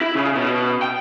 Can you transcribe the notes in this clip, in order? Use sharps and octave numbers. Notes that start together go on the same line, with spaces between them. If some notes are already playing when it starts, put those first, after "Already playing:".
E4
C#3
B2
G5